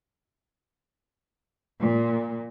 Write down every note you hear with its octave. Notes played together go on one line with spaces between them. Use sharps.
A#2